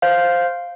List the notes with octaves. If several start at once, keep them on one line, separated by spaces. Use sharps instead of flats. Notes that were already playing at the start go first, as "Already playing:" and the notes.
C5 F5